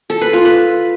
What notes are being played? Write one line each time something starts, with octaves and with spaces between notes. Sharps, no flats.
A4
B4
F4
B4